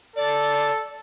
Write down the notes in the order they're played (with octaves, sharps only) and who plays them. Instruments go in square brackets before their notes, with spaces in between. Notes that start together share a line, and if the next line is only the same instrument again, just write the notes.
[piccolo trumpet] A4 [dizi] D5